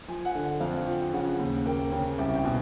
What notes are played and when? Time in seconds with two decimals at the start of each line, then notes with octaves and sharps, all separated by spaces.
0.08 F3 G#5
0.25 F#5
0.35 D3
0.60 F2 F5
0.87 F3
1.13 C#3 F#5
1.39 D#2
1.66 A#3 G5
1.92 C#3
2.18 C2 G5
2.35 G5
2.44 B2 G#5